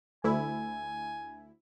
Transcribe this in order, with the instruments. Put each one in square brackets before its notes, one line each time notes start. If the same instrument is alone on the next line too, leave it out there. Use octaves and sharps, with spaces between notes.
[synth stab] D2 E4 [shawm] G#5